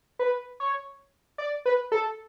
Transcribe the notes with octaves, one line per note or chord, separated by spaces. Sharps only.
B4
C#5
D5
B4
A4